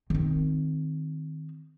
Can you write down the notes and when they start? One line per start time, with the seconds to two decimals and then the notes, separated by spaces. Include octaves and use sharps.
0.10 D#3 C4